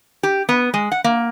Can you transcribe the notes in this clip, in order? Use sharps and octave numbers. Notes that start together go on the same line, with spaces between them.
G4
B3
G#3
F#5
A#3